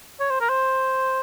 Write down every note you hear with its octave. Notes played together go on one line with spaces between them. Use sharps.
C#5
C5
A#4
C5